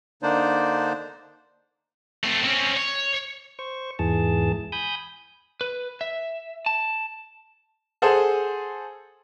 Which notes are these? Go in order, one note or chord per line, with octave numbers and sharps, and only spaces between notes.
D3 A#3 D4 D#4 C5 D5
A3 C4
C4 C#4
C#5
C5 C#6
E2 G#2 E3 G#4 A5
G#5 B5 D#6 G6
B4
E5
A5
G#4 A4 C5 F#5 G#5 A5